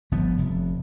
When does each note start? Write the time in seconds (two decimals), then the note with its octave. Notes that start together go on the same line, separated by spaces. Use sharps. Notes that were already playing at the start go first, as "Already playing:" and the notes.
0.12 G1 F3 B3
0.38 F1